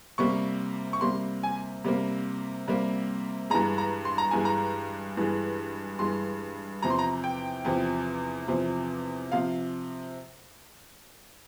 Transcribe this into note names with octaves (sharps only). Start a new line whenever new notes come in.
C3 G3 A#3 C#6
C#6
C3 G3 A#3 C6
G#5
C3 G3 A#3
C3 G3 A#3
G2 E3 G#3 A#5
A#5
C6
A#5
G2 E3 G#3 G#5
A#5
G2 E3 G#3
G2 E3 G#3 C6
E2 C3 F3 A#5
C6
A#5
G5
E2 C3 F3
E2 C3 F3
C3 F3 F5